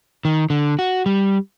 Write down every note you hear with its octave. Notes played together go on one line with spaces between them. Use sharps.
D#3
D3
F#4
G3